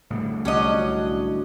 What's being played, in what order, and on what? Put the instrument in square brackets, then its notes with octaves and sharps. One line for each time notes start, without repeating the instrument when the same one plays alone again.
[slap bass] A2 D3 G3
[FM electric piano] C2 [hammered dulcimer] F#3 D4 C#5 [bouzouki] C#4 D#5